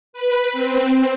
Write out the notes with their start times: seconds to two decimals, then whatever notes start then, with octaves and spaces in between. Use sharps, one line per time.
0.13 B4
0.52 C4